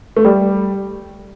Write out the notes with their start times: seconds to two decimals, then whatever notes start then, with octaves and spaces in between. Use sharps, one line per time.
0.16 A3
0.25 G3